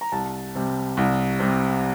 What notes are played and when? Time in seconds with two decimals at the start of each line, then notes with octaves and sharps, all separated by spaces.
0.01 A#5
0.12 C2 A5
0.55 C3 G3
0.97 C2
1.39 C3 G3